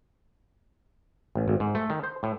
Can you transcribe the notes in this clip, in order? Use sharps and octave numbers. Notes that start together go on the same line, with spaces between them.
A1
G#1
G#2
A3
D#3
C5
A2